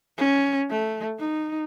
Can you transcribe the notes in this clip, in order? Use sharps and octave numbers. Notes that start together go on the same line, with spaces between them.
C#4
A3
D#4